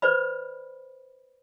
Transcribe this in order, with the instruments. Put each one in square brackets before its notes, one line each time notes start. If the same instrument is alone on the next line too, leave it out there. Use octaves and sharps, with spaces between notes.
[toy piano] B4 C5 D5 B5